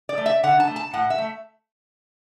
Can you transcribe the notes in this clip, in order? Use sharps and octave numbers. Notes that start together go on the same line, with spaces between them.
D5
A3
E5
D3 F#5
A5
A3
A5
A2 F#5
E5
A3